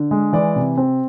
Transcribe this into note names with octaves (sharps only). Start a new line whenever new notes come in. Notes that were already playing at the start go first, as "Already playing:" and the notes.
Already playing: D3
G#3
E3 D5
C3
C4